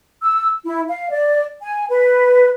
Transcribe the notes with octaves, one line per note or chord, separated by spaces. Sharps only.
E6
E4
F5
D5
G#5
B4